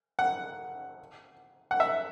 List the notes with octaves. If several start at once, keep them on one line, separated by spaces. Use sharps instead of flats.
F#5
F#5
E5